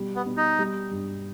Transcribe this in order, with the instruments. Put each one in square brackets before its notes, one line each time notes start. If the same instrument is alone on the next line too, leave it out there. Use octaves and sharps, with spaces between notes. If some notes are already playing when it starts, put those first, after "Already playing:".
Already playing: [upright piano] B2 G3
[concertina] B3
[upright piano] B2
[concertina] D#4
[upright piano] G3
G2